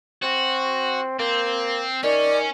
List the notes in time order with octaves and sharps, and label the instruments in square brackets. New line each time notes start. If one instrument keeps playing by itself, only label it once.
[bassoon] C4 [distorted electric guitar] F#4
[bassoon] A#3 [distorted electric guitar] C4
[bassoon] D#3 [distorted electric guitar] C#4 [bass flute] D5